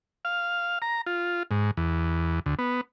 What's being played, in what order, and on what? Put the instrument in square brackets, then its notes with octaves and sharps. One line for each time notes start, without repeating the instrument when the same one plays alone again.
[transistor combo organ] F5
A#5
F4
G#2
E2
D2
B3